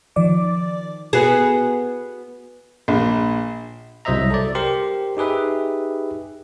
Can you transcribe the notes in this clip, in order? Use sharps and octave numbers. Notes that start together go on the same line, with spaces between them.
D#3 F3 D5 D6
B3 F#4 G#4
A#1
C2 F#3 C5 D#5 E5 A#5
A4 D5
G4 A#4 C5 C6
D#4 G4 G#4 B4 E5